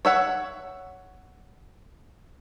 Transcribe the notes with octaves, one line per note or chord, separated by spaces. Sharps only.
C#5 E5 F#5